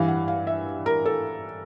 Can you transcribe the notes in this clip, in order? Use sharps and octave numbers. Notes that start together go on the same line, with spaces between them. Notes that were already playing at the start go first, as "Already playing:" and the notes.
Already playing: G2 E3 G3 F5
F#5
F5
E5
A#4
A4